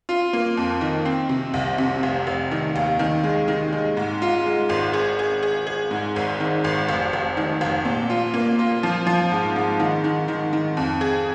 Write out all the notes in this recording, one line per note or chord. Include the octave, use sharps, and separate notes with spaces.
F4
A#3
F2
D#3
C4
C3
C2
C3
F1
F1
D#3
D#2
D#3
G#3
D#3
G#3
G#2
F4
G#3
G#1
G#4
G#4
G#4
G#4
G#2
G#1
D#3
G#1
F1
F1
D#3
F1
A#2
F4
A#3
F4
F3
F3
G#2
G#2
D#3
D#3
D#3
D#3
F2
G#4